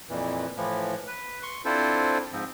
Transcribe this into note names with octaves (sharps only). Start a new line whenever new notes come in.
F2 A#2 E3
A2 E3 F3
B4
C6 C#6
C4 D4 E4 F4 A4 C5
G#2 F3 C4